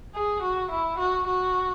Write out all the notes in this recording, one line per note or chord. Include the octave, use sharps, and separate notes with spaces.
G#4
F#4
E4
F#4
F#4